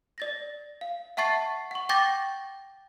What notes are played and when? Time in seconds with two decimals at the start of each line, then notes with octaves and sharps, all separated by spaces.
0.18 D5 A6 A#6
0.81 F5
1.17 E5 F#5 A5 C#6 A6 C7
1.71 F#5 C#6
1.89 G5 C#6 D6 G6 A6 A#6